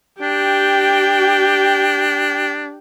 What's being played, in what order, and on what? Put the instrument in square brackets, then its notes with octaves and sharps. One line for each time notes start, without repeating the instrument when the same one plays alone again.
[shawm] D4 [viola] G4 G5